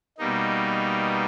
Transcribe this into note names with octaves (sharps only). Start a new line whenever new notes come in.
B2 G3 A#3 D#4